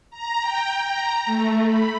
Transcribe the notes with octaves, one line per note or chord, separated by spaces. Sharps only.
A#5
G5
A#5
A3
B5